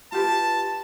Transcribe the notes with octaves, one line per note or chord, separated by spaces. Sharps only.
F4 G4 B4 A5